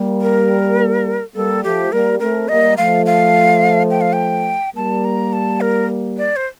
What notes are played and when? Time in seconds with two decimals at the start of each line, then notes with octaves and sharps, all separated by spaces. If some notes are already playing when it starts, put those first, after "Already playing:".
Already playing: G3 A#3
0.21 A#4
1.35 G3 A#3 A4
1.64 F3 A3 G4
1.91 G3 A#3 A#4
2.20 A3 C4 A#4
2.48 G3 A#3 D#5
2.77 F3 A3 F5
3.06 F5
3.90 G5
4.01 F5
4.13 G5
4.75 G3 A#3 A5
5.05 A#5
5.33 A5
5.61 A#4
6.17 D5
6.36 C5